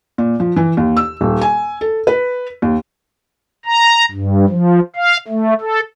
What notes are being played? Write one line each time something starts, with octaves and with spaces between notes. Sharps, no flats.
A#2
F3
E3
D#2
E6
D#1
G#5
A4
B4
D#2
A#5
G2
F3
F5
A3
A4